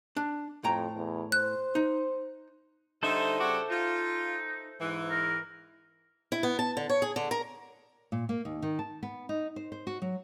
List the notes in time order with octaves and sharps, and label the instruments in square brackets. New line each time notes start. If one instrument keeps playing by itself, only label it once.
[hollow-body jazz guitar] D4
[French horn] F2 [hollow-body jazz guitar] A2 G5 A#5
[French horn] E2
[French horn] C5 [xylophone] F#6
[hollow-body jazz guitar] D#4
[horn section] D3 G3 D#4 [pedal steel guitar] A4 C5 E5
[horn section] C#3 G3 F#4 [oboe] D6
[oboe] D#4 [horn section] F4
[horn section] G#2 E3
[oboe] A#4
[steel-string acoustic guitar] E4
B3
A5
D3
C#5
G#4
D3
A#4
[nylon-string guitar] A#2
A#3
D#2
D#3
A5
B3
D#4
C5
C5
F#4
F#3